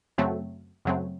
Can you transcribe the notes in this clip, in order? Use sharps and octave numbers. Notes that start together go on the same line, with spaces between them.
F#2 C#3 F#3 A3 C4
F#2 C#3 F#3 A3 C4